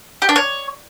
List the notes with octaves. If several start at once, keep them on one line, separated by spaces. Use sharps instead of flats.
G4
D4
C#5